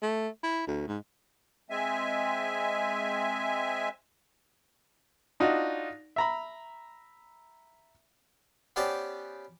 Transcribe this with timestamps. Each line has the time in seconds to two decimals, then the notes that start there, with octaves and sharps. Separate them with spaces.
0.02 A3
0.43 E4
0.67 D2
0.88 G#2
1.70 G#3 C4 E5 G#5
5.40 D4 D#4 F4 F#4
6.16 E5 A#5 B5
8.76 B3 C#4 G4 C5 D5 A5